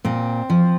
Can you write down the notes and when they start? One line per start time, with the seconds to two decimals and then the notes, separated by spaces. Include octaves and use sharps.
0.05 A#2 C4
0.50 F3